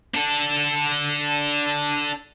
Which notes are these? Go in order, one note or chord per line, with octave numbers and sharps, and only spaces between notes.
D4 A4